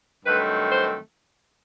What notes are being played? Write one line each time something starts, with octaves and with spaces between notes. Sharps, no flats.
G2 D#3 F#3 A3 C4 B4
C5